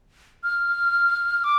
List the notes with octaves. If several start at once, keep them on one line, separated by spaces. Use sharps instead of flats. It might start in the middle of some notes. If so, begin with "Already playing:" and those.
F6
D6